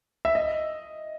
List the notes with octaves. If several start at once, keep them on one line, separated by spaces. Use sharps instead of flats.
E5
D#5